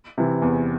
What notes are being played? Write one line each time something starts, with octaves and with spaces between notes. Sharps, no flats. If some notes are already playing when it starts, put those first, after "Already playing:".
C3 E3
E2